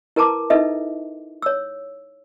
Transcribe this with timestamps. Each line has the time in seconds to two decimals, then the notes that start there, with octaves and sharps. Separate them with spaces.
0.16 E4 A#4 B4 A5 A#5 D6
0.50 D#4 E4 A4 B4 D#5 E5
1.42 C#5 E6